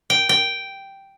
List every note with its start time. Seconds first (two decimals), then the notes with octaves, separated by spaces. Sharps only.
0.10 G5
0.29 G5